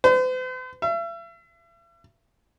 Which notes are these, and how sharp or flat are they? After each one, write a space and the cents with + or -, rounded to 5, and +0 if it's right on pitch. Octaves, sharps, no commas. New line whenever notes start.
C5 -45
E5 +40